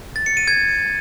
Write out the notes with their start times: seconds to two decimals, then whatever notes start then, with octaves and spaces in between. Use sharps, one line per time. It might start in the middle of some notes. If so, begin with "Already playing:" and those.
0.16 A6
0.26 C#7
0.37 D#7
0.48 G#6